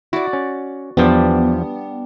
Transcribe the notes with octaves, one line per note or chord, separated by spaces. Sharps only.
E4 F#4 D5
C#4
E2 F3 G3 B3 D4